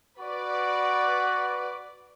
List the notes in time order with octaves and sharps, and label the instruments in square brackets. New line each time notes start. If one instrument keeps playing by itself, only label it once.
[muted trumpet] F#4 [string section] B4 D5